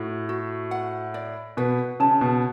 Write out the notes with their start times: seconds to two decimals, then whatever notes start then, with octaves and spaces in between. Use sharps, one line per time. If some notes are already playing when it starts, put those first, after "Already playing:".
Already playing: A2 F#4
0.29 F#4
0.71 F#5
1.14 D5
1.57 B2 B4
2.00 C#3 A5
2.21 B2